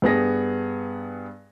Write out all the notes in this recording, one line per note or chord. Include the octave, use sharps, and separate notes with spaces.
G2 B3 G#4 A#6